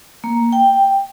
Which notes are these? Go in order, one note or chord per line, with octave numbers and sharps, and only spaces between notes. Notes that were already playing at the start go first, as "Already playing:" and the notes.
A#3
G5